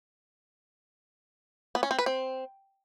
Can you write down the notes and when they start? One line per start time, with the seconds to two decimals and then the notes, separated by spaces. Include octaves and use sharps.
1.75 B3
1.83 C#4
1.91 C4
1.99 B4
2.06 C4